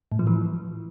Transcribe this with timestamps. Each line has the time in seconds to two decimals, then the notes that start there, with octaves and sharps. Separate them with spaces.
0.12 A2
0.19 F3
0.27 E3